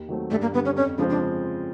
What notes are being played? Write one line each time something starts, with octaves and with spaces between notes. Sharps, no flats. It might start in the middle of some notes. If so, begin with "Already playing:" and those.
Already playing: D#2
D#3 F#3 A3 C4
G2 A3
A#3
D3 G3 B3
C#4
F2 C#4
C#3 F3 G#3 C4 D4
D4